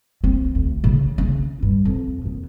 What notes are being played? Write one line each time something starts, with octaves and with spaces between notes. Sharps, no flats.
C4
D2
C#3
C#4
G2
F2
D#2